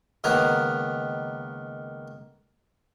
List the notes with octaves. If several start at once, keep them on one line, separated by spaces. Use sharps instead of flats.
C#2 D#3 A#3 B3 A#5